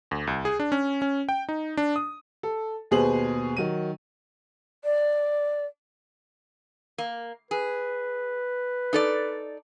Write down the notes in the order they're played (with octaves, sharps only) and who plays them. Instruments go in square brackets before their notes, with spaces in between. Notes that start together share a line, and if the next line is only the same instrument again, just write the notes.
[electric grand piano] D2
C2
G#4
D4
C#4
C#4
G5
D#4
D4
D#6
[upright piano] A4
D#2 B2 G#4 B4 C5 F#7
D#3 F#3 D#7
[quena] D5
[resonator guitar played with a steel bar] A#3
[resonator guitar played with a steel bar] G#4 [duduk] B4
[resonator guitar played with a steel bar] D#4 A4 D5